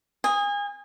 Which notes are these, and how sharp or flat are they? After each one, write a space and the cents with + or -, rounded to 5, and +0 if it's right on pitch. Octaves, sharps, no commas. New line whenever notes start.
G#5 -30 D#6 +0